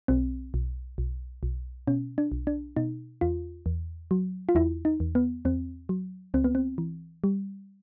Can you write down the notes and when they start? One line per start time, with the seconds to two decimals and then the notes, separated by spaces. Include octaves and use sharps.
0.08 B1 C4
0.54 B1
0.98 B1
1.43 B1
1.87 B2 C#4
2.18 D4
2.32 B1
2.47 D4
2.76 B2 D#4
3.21 E2 F4
3.66 E2
4.11 F#3
4.49 F4
4.55 E2 E4
4.85 D#4
5.00 E2
5.15 B3
5.45 E2 C4
5.89 F#3
6.34 C#2 C4
6.44 B3
6.55 C4
6.78 E3
7.24 G3